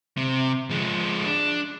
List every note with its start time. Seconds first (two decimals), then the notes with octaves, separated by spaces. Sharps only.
0.17 C3
0.70 F3 G#3
1.26 D4